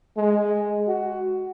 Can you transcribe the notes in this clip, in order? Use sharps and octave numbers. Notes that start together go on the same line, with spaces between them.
G#3
F#4